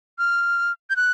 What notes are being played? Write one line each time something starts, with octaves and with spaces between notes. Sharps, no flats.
F6
G6
F#6